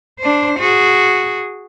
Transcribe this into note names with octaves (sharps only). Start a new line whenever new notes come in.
D4 C5
F#4 G#4